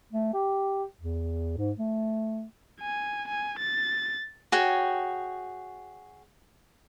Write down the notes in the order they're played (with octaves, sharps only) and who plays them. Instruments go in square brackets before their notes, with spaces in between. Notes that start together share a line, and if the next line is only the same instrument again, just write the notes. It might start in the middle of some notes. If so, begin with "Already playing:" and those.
[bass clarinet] A3
G4
E2
G#2
A3
[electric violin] G#5
G#5
A6
[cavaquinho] F#4 G#4 C#5 G5